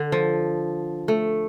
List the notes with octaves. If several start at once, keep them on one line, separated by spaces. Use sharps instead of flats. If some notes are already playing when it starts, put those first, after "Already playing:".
Already playing: D3
F3
A3